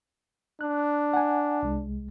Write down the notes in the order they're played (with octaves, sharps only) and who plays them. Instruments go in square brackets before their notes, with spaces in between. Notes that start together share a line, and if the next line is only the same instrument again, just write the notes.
[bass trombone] D4 [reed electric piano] F#6
[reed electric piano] F#5 G#5
C2 G#3